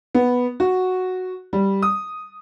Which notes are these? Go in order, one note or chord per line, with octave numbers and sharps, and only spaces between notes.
B3
F#4
G3
D#6